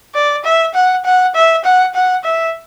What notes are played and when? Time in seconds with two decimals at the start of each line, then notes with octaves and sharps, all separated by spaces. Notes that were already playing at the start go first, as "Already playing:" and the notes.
0.15 D5
0.44 E5
0.74 F#5
1.05 F#5
1.35 E5
1.64 F#5
1.94 F#5
2.24 E5